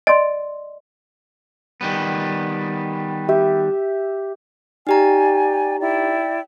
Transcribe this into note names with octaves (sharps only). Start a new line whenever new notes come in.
D5 D#5 C6
D#3 G3 B3
G4 E5
D#4 G4 D5 G5 G#5 A#5
E4 D5 G5